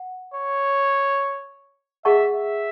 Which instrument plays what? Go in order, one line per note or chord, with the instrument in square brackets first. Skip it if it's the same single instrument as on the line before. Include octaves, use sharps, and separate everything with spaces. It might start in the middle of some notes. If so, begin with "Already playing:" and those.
Already playing: [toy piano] F#5
[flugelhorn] C#5
[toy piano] G#4 D#5 F#5 A5 C#6 [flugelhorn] E5
[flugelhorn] E5